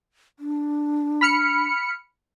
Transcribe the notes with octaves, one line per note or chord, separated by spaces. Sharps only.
D4
B5 F6 C#7